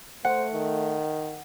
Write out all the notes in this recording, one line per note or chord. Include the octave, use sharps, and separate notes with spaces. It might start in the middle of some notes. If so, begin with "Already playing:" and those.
A3 C5 F#5
D#3